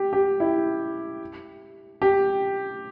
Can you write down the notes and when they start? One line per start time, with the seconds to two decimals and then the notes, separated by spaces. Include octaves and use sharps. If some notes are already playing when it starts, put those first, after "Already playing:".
Already playing: G4
0.13 G4
0.40 E4
2.02 G4